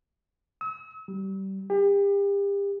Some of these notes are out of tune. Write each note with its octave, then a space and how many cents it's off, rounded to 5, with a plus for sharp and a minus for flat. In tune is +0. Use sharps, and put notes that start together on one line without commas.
E6 -40
G3 -30
G4 +35